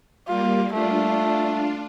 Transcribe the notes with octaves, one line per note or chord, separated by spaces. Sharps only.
G3 A#3 F4
A3 D4 F4